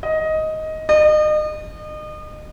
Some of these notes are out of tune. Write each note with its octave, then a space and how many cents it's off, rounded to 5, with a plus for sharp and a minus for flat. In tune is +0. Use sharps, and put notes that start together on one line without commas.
D#5 +10
D#5 -35